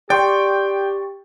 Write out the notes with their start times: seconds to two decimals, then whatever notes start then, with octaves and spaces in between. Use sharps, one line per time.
0.10 G4 D5 G5 C6 C#6